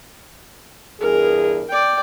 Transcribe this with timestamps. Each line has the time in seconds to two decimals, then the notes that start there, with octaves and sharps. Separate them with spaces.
1.00 E2 G2 G#4 A#4
1.69 D5 G5